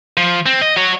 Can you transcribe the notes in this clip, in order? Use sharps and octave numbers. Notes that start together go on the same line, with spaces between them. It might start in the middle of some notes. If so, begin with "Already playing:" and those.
F3
C4
D#5
F#4 C#5